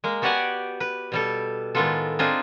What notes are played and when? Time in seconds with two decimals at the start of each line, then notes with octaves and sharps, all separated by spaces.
0.04 G#3 A#3
0.22 B3 F#4 G4 D5 F#5 G#5
0.80 B4
1.12 B2 G3 A4
1.75 A2 D#3 G#3 B3 F4 A4
2.19 C4 D4 D#4 F4 G#4